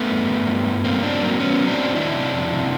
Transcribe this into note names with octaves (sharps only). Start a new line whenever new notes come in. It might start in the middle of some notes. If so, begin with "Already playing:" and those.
Already playing: A3 B3
G2
G2
G2
G2
B2 A#3 C4
F#3 C4 D4
F#3 A#3 C4
F#3 B3 C#4
F#3
C4 D4
F#3
D#3 D4 E4
C3
F2
C3